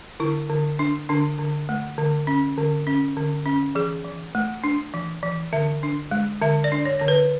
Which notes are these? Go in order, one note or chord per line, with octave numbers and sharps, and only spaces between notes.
D3 E4
D3
D4
D3 D4
D3
A3
D3
C#4
D3
C#4
D3
C#4
E3 G#4
E3
A3
D4
E3
E3
D3 E5
D4
G#3
D3 E5
D5
D4
C#5
D3 C#5
B4